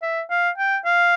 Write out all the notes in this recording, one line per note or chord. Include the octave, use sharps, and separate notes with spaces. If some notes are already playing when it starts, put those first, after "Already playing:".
E5
F5
G5
F5